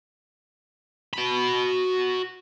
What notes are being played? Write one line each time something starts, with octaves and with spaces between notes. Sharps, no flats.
F#4 B5